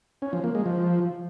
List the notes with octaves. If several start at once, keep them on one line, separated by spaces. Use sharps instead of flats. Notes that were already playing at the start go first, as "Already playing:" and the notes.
C#4
F3
A#3
G#3
F3